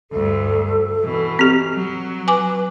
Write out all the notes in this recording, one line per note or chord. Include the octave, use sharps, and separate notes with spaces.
D2 G2 A4
B2 E3
C4 G4
F#3
B4 G#5 D6